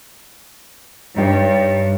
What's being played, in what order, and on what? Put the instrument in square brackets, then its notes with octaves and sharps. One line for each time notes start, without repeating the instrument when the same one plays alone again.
[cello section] G2 [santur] D#4 G4 C#5